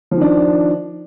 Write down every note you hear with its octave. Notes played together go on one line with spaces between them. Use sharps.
D#3 F3 D4